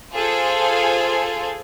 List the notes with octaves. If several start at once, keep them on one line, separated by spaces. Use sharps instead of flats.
F4 G#4 A4 C5